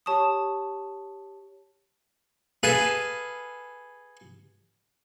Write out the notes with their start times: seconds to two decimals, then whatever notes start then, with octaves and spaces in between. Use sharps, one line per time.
0.06 G4 C#5 A5 C#6 D#6
2.63 G#4 A4 B4 F5 G#5 A5